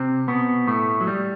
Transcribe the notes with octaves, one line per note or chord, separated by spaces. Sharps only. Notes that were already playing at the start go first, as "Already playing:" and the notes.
Already playing: C3 C4
B2 B3
A2 A3
F#3
G3